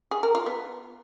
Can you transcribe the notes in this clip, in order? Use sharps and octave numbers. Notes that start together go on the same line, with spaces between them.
G#4
A#4
F4
B3